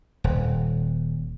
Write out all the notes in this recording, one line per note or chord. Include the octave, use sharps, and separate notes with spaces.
D#1